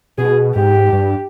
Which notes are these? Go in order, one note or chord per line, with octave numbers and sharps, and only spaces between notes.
B2 G#4
G#2 G4
G2